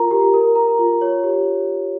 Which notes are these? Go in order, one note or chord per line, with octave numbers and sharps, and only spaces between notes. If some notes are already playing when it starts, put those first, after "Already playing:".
Already playing: F4 A#4 A#5
G4
A#4
A#5
F4
C#5
G4